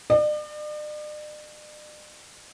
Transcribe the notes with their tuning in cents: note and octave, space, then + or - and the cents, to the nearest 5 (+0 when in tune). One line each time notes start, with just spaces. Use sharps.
D5 +45